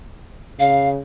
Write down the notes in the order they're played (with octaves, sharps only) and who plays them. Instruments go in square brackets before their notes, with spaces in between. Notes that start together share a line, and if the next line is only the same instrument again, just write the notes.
[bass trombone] C#3 [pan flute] F5